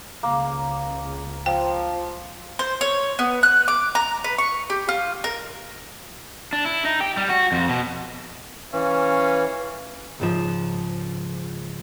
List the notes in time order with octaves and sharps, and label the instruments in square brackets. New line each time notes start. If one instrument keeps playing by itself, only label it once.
[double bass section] C#2 [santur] A#3
[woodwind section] F3 [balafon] G5
[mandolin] C5
C#5
B3
F#6
D6
A#5
B4
C#6
G4
F4
A#4
[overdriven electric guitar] D4
E4
D#4
G4
G3
F#4
F2
B2
[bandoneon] E3 [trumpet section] C#4 F5
[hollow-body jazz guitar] C#2 G#2 F3